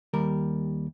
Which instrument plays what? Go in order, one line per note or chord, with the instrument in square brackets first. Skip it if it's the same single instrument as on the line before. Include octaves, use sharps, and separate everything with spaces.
[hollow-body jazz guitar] D#2 G3 A#4